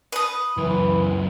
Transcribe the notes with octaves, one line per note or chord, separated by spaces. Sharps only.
B4 D#6
C#2 F#2 E3